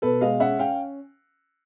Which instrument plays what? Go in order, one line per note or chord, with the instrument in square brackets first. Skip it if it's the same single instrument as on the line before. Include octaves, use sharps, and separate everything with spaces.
[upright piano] B2 A4 B4
G#3 D#5 F5
C#4 E5 F#5
C#4 F5 G5